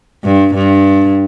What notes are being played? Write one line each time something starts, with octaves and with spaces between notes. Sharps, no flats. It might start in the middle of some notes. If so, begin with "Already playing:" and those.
G2
G2